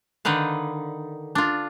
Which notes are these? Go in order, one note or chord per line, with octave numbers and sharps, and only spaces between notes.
D3 D#3 D#4 B4 F5
D4 F4